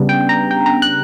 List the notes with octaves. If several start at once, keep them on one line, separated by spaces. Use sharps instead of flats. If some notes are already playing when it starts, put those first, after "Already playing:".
Already playing: C#3 G3 B3 D4
G5
A#5
G5
A#5
F#6